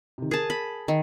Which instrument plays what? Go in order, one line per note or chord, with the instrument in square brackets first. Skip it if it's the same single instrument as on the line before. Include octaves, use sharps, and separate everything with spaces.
[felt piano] C3 D#3
[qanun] G#4 A5 [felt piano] A#4
[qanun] B5
D#3